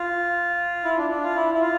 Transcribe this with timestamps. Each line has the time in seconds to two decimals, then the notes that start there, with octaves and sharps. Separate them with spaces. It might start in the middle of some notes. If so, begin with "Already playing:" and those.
Already playing: F4
0.84 E4
0.98 D4
1.10 D4
1.23 F4
1.36 E4
1.54 E4
1.61 F4